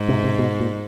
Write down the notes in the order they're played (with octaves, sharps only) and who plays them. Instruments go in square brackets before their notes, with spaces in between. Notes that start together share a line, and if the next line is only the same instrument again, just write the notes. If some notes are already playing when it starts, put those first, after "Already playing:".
Already playing: [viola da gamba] G#2
[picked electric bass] C3
C3
B2
A#2